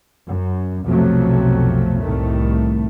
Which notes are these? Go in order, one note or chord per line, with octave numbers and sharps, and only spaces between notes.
F#2
B1 F2 C3 F3 F#3 A3
C2 A2 D#3 A3